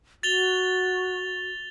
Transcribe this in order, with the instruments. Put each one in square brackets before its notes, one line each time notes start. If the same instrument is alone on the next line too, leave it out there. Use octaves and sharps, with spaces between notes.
[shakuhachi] F#4 [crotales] A6 F7 G7